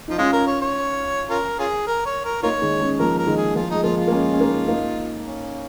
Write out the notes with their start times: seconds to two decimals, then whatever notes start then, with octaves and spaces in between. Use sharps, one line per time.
0.08 F3 D#4
0.18 G#3 C#4 F4
0.32 A#4
0.47 C#5
0.61 C#5
1.30 C#4 F4 A#4
1.59 C#4 F4 G#4
1.87 A#4
2.05 C#5
2.25 A#4
2.43 A#3 D#4 F4 A#4 C#5
2.62 D#3 G#3
2.81 G#3 C#4
2.99 F3 A#3 A#4
3.18 A#4
3.27 D#3 G#3
3.37 G#4
3.55 F3 A#3 F4
3.70 G#3 D#4
3.83 F3 A#3 F4
3.97 F4
4.08 A#3
4.12 G#3 C#4
4.33 C#4
4.40 A#3 D#4
4.68 A#3 D#4
5.24 C#4